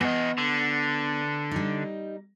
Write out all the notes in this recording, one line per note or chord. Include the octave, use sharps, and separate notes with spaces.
E3 B3 D#5
D3
G3 D#4